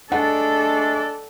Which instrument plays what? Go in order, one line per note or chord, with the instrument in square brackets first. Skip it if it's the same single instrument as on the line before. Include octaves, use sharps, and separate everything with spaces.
[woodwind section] G#3 A3 D4 [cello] A4 D5 [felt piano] F#5